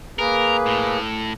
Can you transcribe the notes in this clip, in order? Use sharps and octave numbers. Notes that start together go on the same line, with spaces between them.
A#3 G#4 A#4 B4
A2